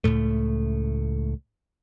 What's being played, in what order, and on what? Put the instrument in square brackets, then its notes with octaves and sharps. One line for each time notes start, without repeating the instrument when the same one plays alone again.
[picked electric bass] C#2 F#2 A2 A3